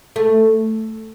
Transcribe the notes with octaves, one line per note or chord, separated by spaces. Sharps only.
A3